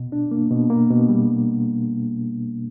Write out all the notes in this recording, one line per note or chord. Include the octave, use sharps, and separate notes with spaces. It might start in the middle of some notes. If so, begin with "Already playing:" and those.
Already playing: B2
D4
A#3
B2
A#3
B2
G3